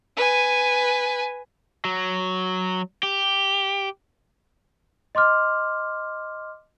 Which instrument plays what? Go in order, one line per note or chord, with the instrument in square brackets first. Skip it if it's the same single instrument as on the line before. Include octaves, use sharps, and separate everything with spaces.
[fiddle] B4 G#5
[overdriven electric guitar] F#3
G4
[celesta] D#5 C6 D6 F6